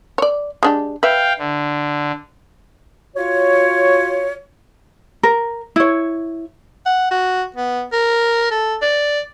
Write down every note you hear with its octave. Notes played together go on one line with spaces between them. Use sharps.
C#5 D5
G#3 D4 G4
B4 E5 F5 G5
D3
F4 F#4 C#5
A#4
E4 C#5
F#5
F#4
B3
A#4
A4
D5